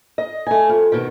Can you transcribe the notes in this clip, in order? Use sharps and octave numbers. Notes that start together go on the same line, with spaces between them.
D#5
A3 G#5
F2
B2 D#3